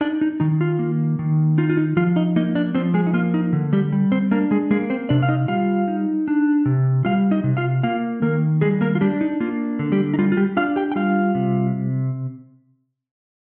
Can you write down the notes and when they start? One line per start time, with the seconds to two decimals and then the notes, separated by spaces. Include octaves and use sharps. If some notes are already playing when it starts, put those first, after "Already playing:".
0.01 D4 D#4 D5
0.21 D#4
0.40 D#3 D#4
0.61 F4
0.79 A#3
1.19 D#3
1.58 D#4 F4
1.69 F4
1.77 D#4
1.97 F3 F4
2.16 D#4 D#5
2.36 A#3 D#4 D#5
2.55 D4 D5
2.74 F3 C4 C5
2.94 G#3 G#4
3.07 D#4
3.13 A#3 F4
3.34 D#4
3.53 D3
3.73 G3 G4
3.92 G3
4.12 C4 C5
4.31 A#3 D4 A#4
4.51 G#3 G#4
4.71 G#3 A#3 G#4
4.90 C4 C5
5.09 C3 D4 D5
5.23 F5
5.29 D#4 D#5
5.48 G3 F4 F5
5.88 D#4
6.28 D4
6.66 C3
7.05 G3 F4 F5
7.31 D#4 D#5
7.44 C3
7.57 F4 F5
7.83 A#3 F4 F5
8.22 D#3 A#3 A#4
8.61 G3 G#3 G#4
8.81 A#3 A#4
8.95 F4
9.01 G3 D4 G4
9.21 D#4
9.40 A#3 F4
9.79 D3
9.92 G3 G4
10.14 D#4
10.19 G3 F4
10.32 F4
10.37 G3 G4
10.57 D4 F4 F5
10.76 G4 G5
10.92 G5
10.96 G3 F4 F5
11.35 C3